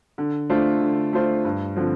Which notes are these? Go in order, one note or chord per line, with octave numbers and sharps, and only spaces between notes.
D3
A3 D4 F4 C5
D3
A3 D4 F4 C5
G2
D3 F3 C4